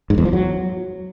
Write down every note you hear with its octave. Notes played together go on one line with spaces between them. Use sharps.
G#2
E2
F3
F#3